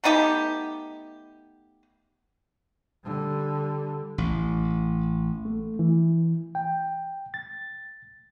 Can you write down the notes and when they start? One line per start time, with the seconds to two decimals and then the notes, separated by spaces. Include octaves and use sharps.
0.04 A3 B3 D#4 G4
3.04 D3 G3
4.18 A1
5.45 A3
5.79 E3
6.55 G5
7.34 A6